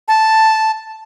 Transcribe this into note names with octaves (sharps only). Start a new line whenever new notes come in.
A5